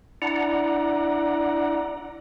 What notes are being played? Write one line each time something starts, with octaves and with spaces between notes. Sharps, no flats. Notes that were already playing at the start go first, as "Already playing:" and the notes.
D4 E4 D5 F#5 A#5